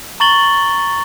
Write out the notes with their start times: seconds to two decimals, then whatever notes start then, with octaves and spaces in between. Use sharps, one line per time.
0.20 A#5 C#6 A6 F#7 G7